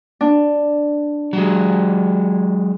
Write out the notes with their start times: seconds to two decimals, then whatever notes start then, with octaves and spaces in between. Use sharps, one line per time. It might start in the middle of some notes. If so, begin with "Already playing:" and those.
0.21 D4
1.33 F#3 G#3